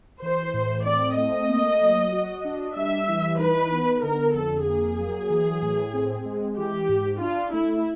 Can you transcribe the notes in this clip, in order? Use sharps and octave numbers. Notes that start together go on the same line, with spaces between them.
E3 C5
A2
C4 D5
A3 D#5
A#3
F#3
F#4
D4
G3 E5
E3
D#4 B4
B3
D3 A#4
F2 A4
A#3 G#4
F#3
E3
A2
C4
G#3
E3 G4
G#2
D4 F4
A3 E4